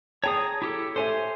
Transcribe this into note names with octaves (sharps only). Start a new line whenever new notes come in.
G#4 C#5 G5 A5 A#5 D#6
E4 G4 A4
A4 C5 C#5 E5 G#5